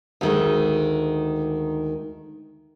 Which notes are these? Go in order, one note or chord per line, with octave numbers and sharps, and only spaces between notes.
D2 D#3 G#3